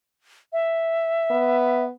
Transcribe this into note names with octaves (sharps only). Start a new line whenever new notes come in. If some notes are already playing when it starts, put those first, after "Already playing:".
E5
B3